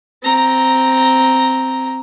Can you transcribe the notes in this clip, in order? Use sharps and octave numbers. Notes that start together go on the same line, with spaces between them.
C4 A#5